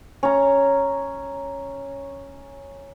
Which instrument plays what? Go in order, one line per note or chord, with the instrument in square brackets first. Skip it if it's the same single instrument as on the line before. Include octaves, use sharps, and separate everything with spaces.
[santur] C#4 A#5